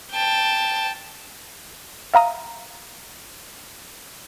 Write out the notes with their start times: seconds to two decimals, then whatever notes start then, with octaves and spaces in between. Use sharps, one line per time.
0.12 G5 A5
2.14 E5 F5 A#5 D#6